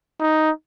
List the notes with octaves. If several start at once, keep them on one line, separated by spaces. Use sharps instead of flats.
D#4